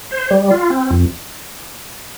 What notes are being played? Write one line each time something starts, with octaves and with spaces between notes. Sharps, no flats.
C5
G3
F4
C4
F2